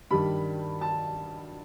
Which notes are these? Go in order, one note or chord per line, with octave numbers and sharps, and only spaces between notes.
G2 D#3 G3 B5
A5